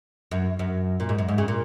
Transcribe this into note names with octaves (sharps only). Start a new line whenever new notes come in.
F#2
F#2
A#2
G#2
F#2
G#2
C#3
A#2